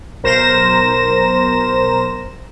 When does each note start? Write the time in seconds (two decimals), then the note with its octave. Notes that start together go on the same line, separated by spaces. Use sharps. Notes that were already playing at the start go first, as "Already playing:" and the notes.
0.23 B1 A#4 C5 A#6 E7